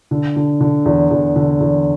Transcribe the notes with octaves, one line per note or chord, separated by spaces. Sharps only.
D3
D3
D3
E2
E2
D3
E2